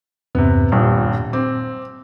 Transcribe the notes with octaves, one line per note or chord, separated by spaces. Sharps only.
E2 G2 C3 B3
D#1 G2 A#2
C4 D6